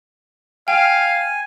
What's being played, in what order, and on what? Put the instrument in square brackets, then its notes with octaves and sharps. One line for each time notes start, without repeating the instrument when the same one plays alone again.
[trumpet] F5 [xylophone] G5 [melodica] G#5